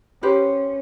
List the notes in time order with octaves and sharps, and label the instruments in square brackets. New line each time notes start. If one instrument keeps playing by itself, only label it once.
[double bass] C#4 [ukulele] G4 B4 C5